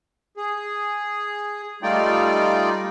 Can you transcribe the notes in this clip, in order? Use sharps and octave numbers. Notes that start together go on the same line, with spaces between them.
G#4
G3 A3 D#4 F4 D5 G5